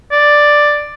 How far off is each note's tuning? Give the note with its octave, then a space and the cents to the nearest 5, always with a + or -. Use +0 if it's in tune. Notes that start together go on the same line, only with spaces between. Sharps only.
D5 +5